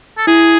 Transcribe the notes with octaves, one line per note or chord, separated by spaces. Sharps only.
A4
E4 G#4